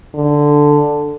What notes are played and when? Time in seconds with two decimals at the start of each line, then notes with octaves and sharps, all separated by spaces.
0.14 D3